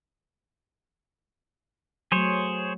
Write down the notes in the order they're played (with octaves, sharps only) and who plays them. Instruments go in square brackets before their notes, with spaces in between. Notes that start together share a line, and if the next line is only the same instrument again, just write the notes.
[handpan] F#3 A3 [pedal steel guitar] G#4 C5 C#5